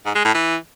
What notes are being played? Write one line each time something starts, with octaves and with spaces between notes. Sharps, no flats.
G#2
G#3
A2
E3